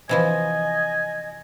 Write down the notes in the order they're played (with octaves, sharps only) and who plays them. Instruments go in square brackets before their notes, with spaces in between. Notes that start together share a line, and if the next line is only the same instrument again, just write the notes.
[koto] C3 E3 F3 [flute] D#5 [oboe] G#5